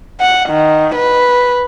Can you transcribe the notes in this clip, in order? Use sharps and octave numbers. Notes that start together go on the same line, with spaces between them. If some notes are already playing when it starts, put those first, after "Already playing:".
F#5
D#3
B4